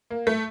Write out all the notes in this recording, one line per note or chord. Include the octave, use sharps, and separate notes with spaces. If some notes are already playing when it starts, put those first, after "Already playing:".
A#3
A3